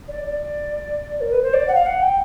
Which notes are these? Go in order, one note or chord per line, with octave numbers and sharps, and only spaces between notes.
D5
D5
A#4
B4
C5
D5
F#5
F5
F#5
G5